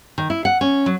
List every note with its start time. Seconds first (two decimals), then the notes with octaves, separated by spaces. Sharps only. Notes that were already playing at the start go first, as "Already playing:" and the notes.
0.18 D#3
0.30 E4
0.45 F#5
0.61 C#4
0.86 F#3